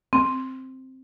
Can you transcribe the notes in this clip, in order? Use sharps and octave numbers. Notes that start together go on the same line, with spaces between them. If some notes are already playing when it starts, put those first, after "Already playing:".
C4